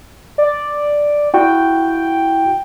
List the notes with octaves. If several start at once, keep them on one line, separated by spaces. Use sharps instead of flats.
D5
E4 F#4 G5